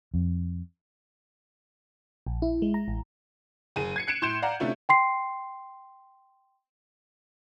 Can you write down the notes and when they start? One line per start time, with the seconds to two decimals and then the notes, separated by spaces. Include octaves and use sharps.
0.14 F2
2.27 A#1
2.42 E4
2.62 G#3
2.74 A#5
2.88 A1
3.76 F#1 G#4 D#7
3.96 G#6 C7 C#7
4.07 F#6 C#7 D7 E7
4.22 A2 C6 G6 E7
4.42 D5 F5 F#5 A#5
4.60 C3 A3 C#4 D4 E4 F4
4.89 G5 C6 C7